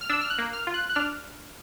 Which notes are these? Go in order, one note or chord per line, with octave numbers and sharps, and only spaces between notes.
F6
D4 E6
F6
F#6
A#3
F6
F4
F#6
F#6
D4 F6